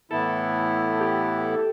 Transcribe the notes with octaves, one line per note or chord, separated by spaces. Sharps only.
A2 E3 B3 E4 A4
G4